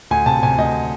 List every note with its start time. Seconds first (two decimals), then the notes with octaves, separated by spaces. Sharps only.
0.11 D2 G#5
0.26 C3 A5
0.43 C3 G#5
0.58 D2 D#5